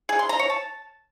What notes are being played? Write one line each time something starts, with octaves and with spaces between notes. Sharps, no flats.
G#4
C6
A#5
C#5
A5